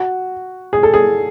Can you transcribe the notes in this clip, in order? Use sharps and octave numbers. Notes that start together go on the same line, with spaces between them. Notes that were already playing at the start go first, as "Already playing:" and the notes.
Already playing: F#4
G#4
A4
G#4